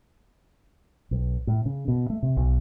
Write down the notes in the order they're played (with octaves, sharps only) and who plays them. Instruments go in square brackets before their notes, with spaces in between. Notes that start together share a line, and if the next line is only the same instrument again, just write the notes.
[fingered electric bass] B1
A2
C#3
B2
A3
C3
B1